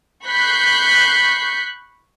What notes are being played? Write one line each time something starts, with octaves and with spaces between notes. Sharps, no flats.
B5 C#6 F#6 G6 B6 C7